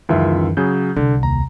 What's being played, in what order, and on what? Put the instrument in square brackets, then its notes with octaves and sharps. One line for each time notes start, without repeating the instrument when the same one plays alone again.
[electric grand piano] C#2 F4 E5 [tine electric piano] F#2 D#3 E3
[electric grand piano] C#3 F#3 G#4 [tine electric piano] G6
[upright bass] C2 [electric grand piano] D3
[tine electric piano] D#2 [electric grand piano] A#5